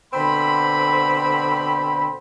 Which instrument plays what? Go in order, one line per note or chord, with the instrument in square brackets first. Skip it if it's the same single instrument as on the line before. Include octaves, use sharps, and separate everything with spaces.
[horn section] B2 D3 C4 B5